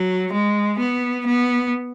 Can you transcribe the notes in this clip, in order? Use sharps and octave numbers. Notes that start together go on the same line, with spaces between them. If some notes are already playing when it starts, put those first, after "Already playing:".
Already playing: F#3
G#3
B3
B3